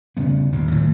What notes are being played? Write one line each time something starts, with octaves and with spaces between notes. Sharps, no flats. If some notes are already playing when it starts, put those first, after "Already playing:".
C#3 G3 B3
G1 D#2 A#2
A2 D#3 F#3